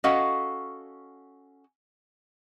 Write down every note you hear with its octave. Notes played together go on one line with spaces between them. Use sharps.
C#4 F#4 A4 D#5 F5 F#5